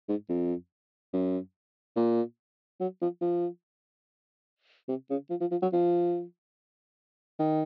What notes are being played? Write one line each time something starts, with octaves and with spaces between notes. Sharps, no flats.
G#2
F2
F#2
A#2
F#3
F3
F3
C3
C#3
F3
F3
F3
F#3
F3
D#3